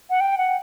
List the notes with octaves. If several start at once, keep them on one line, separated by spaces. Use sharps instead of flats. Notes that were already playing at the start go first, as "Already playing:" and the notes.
F#5
G5
F#5